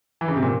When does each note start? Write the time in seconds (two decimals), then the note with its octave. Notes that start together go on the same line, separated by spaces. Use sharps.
0.21 E3
0.28 C#3
0.36 C3
0.43 A#2